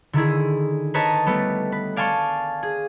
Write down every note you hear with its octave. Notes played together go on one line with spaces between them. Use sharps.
D3 D#3 E4 G#4
A#4 B4 C#5 D#5 A5
G3 A3 B3
B4
D5 F5 G#5 A5 C6 C#6
G#4